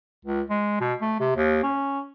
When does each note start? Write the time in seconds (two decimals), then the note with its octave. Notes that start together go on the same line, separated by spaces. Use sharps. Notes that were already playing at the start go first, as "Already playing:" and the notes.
0.25 C#2
0.50 G#3
0.81 B2
1.01 A3
1.20 C3
1.36 D#2
1.63 C#4